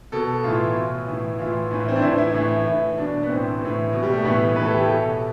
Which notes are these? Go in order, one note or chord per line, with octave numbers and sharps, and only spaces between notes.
B2 A4
A2 E3 F4
B2
A2 E3
A2 E3 F4
A2 E3
C4
D4
A2 E3 E4
E4
A2 E3
A2 E3
B2 D4
B3
A2 E3 C4
A2 E3
B2
G3
A3
A2 E3 B3
A2 E3 B4
A4
G4
B2 A4